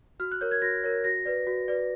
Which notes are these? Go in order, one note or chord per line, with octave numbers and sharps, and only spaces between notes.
F#4 F6
F#6
A#4 C#5 G6
G#6
F#4 A#6
A#4 C#5
F#4 A#6
B4 D5
F#4
B4 D5